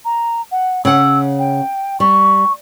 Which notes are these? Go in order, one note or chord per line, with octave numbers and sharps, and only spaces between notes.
A#5
F#5
C#3 F#5 E6
G5
G3 C#6